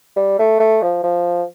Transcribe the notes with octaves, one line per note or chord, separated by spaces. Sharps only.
G3
A3
A3
F3
F3